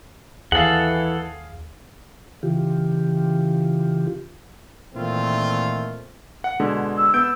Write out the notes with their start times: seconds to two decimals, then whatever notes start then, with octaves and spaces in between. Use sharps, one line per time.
0.52 D#2 E3 G#4 A4 F5 F#5
2.43 C#3 E3 F4 G4
4.94 A#2 D#3 E3 A3 C4 F4
6.44 F#5
6.60 B2 D3 G#3
6.97 E6
7.14 B3 E6 G6 D7